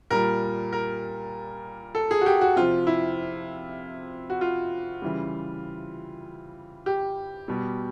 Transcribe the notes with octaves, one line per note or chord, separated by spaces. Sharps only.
A#2 G3 A#4
A#4
A4
G#4
F#4
G4
F#4
C3 F3 F4
E4
F#4
F4
C#3 E3 G3
G4
B2 G3